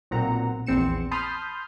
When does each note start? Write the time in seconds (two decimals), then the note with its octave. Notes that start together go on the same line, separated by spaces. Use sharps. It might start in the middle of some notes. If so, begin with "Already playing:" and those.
0.11 B1 A#2 C4 F#5 A#5
0.66 A#1 E2 C4 C#7 E7
1.11 A5 B5 C6 D#6 F6 G6